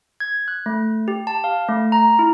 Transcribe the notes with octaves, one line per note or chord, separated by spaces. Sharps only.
G#6
F#6
A3
G4
A5
F5
A3
A#5
E4